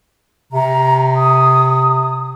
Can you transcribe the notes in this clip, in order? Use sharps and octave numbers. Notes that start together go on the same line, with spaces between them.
C3 A#5
D#6